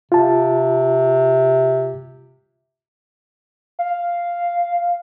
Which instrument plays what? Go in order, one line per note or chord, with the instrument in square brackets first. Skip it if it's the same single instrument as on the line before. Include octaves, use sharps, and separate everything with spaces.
[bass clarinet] C3 [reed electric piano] F4 A5
[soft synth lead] F5